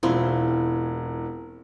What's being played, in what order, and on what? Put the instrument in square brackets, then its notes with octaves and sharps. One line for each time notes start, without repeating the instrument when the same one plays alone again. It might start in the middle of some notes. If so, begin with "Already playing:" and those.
[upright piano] E1 E3 [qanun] C4 E4 F4